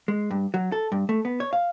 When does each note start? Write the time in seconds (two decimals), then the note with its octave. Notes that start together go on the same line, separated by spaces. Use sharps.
0.08 G#3
0.31 G2
0.54 F#3
0.72 A4
0.92 G2
1.09 A3
1.25 B3
1.40 C#5
1.53 F5